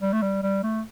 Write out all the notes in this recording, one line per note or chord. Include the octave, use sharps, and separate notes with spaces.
G3
A3
G3
G3
A3